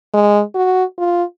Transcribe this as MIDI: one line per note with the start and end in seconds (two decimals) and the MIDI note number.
0.14 0.42 56
0.55 0.84 66
0.98 1.24 65